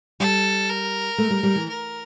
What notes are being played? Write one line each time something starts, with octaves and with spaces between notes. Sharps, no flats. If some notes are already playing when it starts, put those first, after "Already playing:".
G3 A4
A#4
A3
G3
G3
E3
A#4